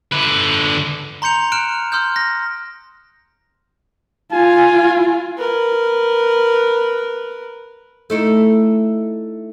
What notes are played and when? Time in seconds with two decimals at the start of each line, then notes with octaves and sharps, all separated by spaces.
0.12 D3 B4
1.22 A#5 C6 G6 C#7 F7
1.52 F6 F#6 C#7 D7 E7
1.92 C6 D#6 F6 G6
2.16 A#6
4.32 F4 G#5
5.38 A#4 B4
8.10 A3 D#4 E4